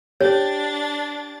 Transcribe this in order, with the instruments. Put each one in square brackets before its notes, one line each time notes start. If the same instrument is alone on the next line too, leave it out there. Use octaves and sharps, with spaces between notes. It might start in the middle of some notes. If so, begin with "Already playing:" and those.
[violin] D4 A6 [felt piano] G4 [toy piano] C#5